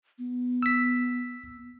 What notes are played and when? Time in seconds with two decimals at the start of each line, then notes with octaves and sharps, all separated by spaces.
0.18 B3
0.63 E6 B6